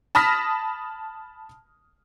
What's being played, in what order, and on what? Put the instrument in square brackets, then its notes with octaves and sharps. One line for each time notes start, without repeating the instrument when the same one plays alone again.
[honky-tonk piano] A5 B5 D#6 F6 A#6 B6